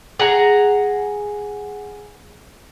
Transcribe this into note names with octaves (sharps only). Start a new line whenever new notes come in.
G#4 F#5 A#5